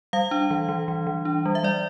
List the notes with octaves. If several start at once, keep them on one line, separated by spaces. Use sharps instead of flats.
G3 F5
D4
E3
E3
E3
E3
D4
G3
E5
G3 D5